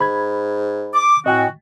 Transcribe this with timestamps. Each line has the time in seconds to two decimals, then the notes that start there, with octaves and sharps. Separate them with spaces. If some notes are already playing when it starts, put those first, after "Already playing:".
0.01 G#2 B5 G#6
0.94 D6
1.26 A2 C4 F#4 D#5 G5 G#5